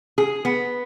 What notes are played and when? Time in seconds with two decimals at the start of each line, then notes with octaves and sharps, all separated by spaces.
0.18 G#4
0.45 B3